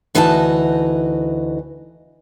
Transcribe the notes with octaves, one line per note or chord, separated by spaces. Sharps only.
D2 E3 D#4 F#4 D#5 A5